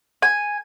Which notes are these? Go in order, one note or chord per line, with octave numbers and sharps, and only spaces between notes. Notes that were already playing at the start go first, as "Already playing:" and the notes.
G#5